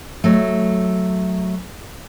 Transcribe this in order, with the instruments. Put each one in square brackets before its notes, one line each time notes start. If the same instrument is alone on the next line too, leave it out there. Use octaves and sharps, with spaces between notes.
[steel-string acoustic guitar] F#3 A3